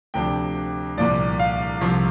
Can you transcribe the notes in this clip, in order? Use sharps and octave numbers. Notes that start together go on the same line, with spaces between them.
D2 C3 F3 D4 G5
C2 A#2 F3 D5
F5
C2 C3 F3